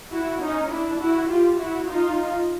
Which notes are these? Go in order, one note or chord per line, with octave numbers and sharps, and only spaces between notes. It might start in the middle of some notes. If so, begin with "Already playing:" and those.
E4 F#4
C#4 D#4
D4 E4
E4 F#4
F4 G4
E4 F#4
D#4 F4